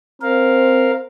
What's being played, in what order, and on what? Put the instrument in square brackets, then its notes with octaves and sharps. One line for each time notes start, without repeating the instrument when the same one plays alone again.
[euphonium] C4 [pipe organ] A#4 F5